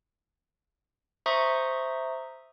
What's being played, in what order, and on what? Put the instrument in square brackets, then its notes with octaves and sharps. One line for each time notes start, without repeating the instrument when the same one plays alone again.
[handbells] C5 E5 A#5 C#6 D#6 G6